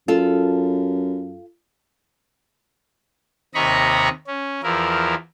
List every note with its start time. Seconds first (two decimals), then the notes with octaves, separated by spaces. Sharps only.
0.08 F#2 F4 A4
3.55 D#2 C3 D#5 A#5 B5 C#6
4.27 C#4
4.63 E2 F3 E4 A#4